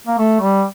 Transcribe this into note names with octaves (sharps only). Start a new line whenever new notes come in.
A#3
A3
G3